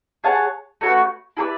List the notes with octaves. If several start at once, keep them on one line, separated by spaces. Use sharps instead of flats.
G#4 C#5 F#5 A5
A3 C#4 F#4 B4
E4 G#4 B4 D5